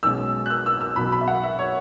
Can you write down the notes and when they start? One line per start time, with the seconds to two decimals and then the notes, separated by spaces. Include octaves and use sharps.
0.03 B1 B2 G#3 C#4 E6
0.46 F#6
0.50 E6
0.66 E6
0.81 E6
0.96 B1 B2 F#3 B5
1.12 B5
1.21 E5
1.28 F#5
1.43 E5
1.59 C#5